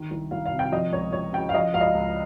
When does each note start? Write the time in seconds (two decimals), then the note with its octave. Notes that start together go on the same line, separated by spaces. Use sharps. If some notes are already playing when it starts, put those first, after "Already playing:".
Already playing: D#3
0.11 C2
0.31 C2 F5
0.46 F5
0.52 C3
0.59 G5
0.72 F3 D#5
0.92 C#2 C#5
1.13 C#2 C#5
1.33 C#3 G5
1.49 F5
1.54 F3 D#5
1.74 C#2 F5
1.81 D#5
1.94 C#2